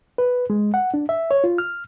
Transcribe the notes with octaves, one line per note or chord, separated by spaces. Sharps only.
B4
G#3
F#5
D4
E5
C#5
F4
F6